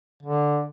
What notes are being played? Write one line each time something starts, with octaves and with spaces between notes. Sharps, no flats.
D3